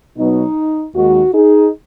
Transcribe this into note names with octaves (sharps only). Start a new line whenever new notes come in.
B2 F#3 B3 D#4
D#2 D#3 G#3 F#4
D#4 G#4